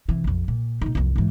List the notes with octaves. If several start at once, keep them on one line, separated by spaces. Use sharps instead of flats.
C3 E3
A#1 F2
A#2
A#2 D#4
C2 F2
G#2 E3